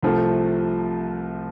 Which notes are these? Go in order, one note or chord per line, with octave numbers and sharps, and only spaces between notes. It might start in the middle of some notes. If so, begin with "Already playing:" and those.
C2 C3 F3 A3